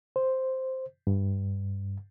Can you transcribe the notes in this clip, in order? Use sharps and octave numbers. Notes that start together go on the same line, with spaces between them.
C5
G2